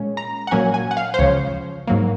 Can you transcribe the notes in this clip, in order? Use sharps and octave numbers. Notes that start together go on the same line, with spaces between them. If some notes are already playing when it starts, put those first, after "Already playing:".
Already playing: A#2 G#3 C#4
A#5
F#5
A#2 F#3 A#3 C#4 G#5
G#5
F#5
F5
C5
C#2 C#3 F3 C#5
G#2 F#3 A#3